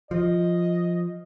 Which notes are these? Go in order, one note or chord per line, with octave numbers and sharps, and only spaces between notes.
F3 D#5